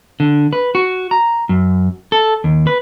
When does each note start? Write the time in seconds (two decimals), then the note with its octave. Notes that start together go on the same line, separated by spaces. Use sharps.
0.20 D3
0.53 B4
0.75 F#4
1.11 A#5
1.49 F#2
2.12 A4
2.44 D#2
2.67 B4